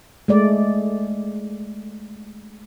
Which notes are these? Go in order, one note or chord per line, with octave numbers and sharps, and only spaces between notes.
G#3 A3 D5